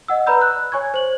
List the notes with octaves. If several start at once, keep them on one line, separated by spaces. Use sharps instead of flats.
D#5 F#5 E6
B4 D5 A#5 B5 E6 G6
F#6
C#5 G#5 C#6 G#6
C5 F#7